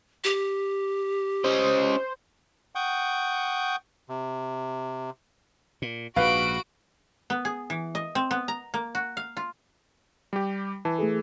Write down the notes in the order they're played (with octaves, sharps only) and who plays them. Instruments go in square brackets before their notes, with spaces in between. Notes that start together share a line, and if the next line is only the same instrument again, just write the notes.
[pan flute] G4
[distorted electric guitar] C#4 D#5 [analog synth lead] C5
[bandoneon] F#5 G5 C#6 D#6 G6
C3
[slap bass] A#2
[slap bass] A#1 G#2 [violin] F#4 D7 [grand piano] B4 F5
[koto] B3
G#4
E3
D#5
C4
B3
A#5
A#3
F#4
F5
F4
[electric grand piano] G3 G4
[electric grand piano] E3 [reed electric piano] A5
[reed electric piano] A3 G#4 A4